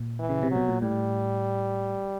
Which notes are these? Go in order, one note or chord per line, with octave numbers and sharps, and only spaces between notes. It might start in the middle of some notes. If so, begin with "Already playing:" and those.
Already playing: A#2
E3
C#3
C3
F#3
B2
A#2
A2 G3